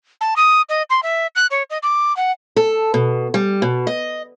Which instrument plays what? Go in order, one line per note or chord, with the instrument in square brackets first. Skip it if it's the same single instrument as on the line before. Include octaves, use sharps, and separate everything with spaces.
[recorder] A5
D#6
D#5
C6
E5
F#6
C#5
D#5
D6
F#5
[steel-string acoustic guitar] A4
B2
G3
B2
D#5